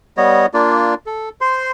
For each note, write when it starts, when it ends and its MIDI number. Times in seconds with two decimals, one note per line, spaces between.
0.17 0.46 55
0.17 0.46 59
0.17 0.46 73
0.17 0.46 75
0.54 0.94 58
0.54 0.94 62
0.54 0.94 65
0.54 0.94 74
1.06 1.29 69
1.41 1.72 72
1.41 1.72 84